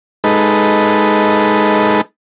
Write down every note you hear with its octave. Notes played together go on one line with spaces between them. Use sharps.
G#3 D#4 A4 B4